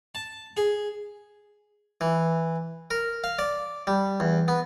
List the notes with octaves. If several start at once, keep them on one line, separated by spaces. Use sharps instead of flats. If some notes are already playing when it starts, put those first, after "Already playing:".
A5
G#4
E3
A#4
F5
D5
G3
E2
B3